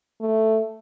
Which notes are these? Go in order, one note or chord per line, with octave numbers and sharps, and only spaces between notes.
A3